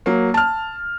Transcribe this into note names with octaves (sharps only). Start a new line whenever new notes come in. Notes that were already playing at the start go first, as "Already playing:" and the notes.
F#3 A#3
A5 F6